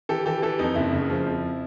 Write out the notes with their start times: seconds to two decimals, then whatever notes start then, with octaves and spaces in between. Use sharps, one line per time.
0.09 E3 G4 A4
0.26 E3 G4 A4
0.42 E3 G4 A4
0.59 F2 D#4
0.75 F#1 E4
0.92 C#3
1.10 F3
1.26 F2